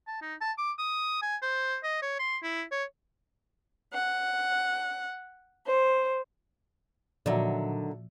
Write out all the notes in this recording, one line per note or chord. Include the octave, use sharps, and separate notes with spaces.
A5
D#4
A5
D6
D#6
G#5
C5
D#5
C#5
C6
E4
C#5
F#5
C5
A#2 D3 D#3 F3 F#3 D5 E5